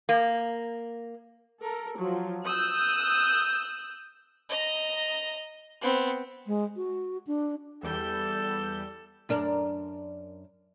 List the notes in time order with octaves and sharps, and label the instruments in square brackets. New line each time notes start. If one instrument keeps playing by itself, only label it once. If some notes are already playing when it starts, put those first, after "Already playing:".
[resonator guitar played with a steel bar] A#3
[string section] A4 A#4
F3 F#3
D#6 E6 F#6 G6
[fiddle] D#5 A#5
B3 C4
[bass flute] G#3
F#4
D4
[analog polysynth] E2 G3 G6 [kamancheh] A4
[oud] F#2 D4 A#4